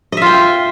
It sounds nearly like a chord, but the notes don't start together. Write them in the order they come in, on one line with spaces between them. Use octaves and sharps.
D#5 E5 F4 G5